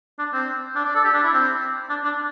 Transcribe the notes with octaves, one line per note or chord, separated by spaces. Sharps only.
D4
C4
D4
D5
A4
G4
D4
E4
C4
D4
D4